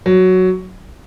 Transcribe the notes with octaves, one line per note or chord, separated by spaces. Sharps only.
F#3